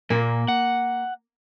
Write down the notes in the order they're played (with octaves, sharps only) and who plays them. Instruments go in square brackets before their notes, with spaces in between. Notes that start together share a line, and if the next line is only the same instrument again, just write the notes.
[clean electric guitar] A#2 [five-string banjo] A#3
[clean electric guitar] F#5